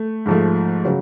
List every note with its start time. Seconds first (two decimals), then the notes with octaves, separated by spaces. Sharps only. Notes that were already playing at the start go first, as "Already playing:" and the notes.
Already playing: A3
0.26 G#2 F3 A3
0.85 C#3 F#3